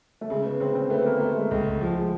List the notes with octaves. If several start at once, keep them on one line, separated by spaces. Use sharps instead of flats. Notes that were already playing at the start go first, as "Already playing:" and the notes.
A3
C#3 G#3
B3
C#3 C4
C4
A3 B3
A#3
A3 A#3
G#3
C#2 G#3
F3
G#3